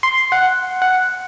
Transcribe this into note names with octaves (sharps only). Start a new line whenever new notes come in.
C6
F#5
F#5